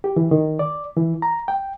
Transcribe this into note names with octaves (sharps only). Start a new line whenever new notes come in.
G4
E3
D#3
D5
E3
A#5
G5